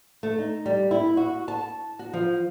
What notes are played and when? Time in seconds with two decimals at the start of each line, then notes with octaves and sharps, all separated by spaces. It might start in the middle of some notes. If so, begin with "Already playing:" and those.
0.23 A3
0.39 D#4
0.66 G3
0.91 E4
1.17 F#4
1.48 A5
1.99 F#4
2.13 F3